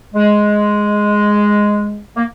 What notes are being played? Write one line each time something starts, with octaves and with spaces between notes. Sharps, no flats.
G#3
A#3